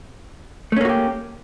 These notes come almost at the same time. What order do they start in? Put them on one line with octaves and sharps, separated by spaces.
A3 C#4 A#3 F#4 G4